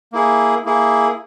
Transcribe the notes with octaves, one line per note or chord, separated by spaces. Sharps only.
A#3 E4 G#4
A#3 E4 G#4